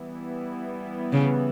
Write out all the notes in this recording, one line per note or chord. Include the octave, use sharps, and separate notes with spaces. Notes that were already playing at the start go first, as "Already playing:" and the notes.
Already playing: E3 G3 B3 E4
C#3